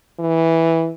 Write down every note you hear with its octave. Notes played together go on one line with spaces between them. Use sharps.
E3